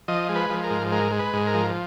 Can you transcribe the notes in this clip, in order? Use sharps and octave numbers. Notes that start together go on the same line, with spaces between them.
F3 D#5
G#3
B4
F3
A#4
G#2
G#3 A#4
G#3
B4
G#2
A#4
F3